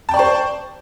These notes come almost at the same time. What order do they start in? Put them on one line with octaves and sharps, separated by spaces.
A5 G5 D5 C#6 C5